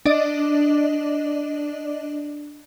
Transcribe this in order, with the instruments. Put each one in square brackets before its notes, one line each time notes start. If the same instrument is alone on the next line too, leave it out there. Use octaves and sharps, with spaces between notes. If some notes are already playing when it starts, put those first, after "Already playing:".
[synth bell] D4 D5 D#5